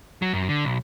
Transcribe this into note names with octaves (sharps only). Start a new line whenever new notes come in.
F#3
F#2
D3
B1